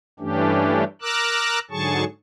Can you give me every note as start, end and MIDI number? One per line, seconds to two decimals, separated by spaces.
0.20 0.84 43
0.20 0.84 52
0.20 0.84 57
0.20 0.84 61
0.20 0.84 62
0.20 0.84 67
1.02 1.59 70
1.02 1.59 82
1.02 1.59 86
1.02 1.59 88
1.02 1.59 90
1.71 2.04 44
1.71 2.04 50
1.71 2.04 54
1.71 2.04 68
1.71 2.04 81
1.71 2.04 85